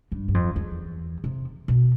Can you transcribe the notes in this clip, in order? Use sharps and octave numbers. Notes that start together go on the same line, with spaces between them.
G2
G2
F2
E2
C3
B2